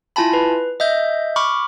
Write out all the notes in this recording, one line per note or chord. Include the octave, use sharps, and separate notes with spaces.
E4 F4 G#5 A5 B5
B4
D#5 E5 G6
B5 C#6 D6 F6